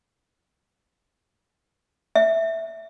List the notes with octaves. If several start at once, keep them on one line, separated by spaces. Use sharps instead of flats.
E5